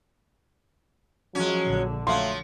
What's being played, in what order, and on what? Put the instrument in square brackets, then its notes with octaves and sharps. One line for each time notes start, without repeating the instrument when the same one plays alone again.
[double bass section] F3 [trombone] F#3 [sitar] G#3 C#4
[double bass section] A#1 D3
[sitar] F3 F#3 [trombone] A3 [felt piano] F5 C6